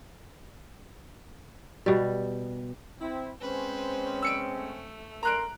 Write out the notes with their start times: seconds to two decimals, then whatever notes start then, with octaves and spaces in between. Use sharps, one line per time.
1.86 B2 G3
2.99 C4 E4
3.41 G#3 C4 C#4 B4 C5
4.22 E6 C#7 D7
4.55 A3
5.23 A#4 A#5 C6 F#6 D7